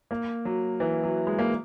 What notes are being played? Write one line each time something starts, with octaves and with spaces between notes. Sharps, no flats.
A#3
F#3
E3
F#3
G#3
A#3